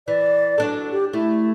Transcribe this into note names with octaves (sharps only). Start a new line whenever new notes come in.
E3 D5
F#3 D4 A4
G4
A3 E4